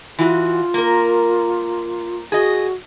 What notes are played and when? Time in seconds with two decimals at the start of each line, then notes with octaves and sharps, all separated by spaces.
0.19 E3 F4 F#4
0.74 A#3 A#4
2.32 F#4 G#4 D#5